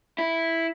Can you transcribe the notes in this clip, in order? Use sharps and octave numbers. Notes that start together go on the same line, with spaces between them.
E4